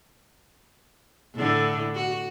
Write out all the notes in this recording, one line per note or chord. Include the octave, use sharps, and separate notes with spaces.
A2 D3
F#4